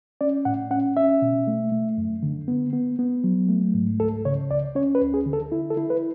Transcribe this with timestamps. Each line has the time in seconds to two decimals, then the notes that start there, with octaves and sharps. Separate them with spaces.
0.21 C#4 D5
0.45 A2 F#5
0.71 C#4 F#5
0.96 C#4 E5
1.22 B2
1.47 A3
1.72 A3
1.98 F#2
2.23 D3
2.48 B3
2.73 B3
2.99 B3
3.24 F#3
3.49 A3
3.74 G#2
3.99 C#2 A4
4.25 C#3 C#5
4.51 C#2 D5
4.75 C#4 C#5
4.95 B4
5.01 D2
5.14 G#4
5.26 D3
5.33 A4
5.52 E4
5.70 A4
5.77 E4
5.90 B4